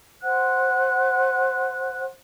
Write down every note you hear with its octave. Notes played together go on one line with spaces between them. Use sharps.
C5 F#5 F#6